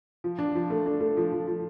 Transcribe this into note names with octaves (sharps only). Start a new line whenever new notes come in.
F3
D4
F3
A3
D4
A3
F3
F3
F3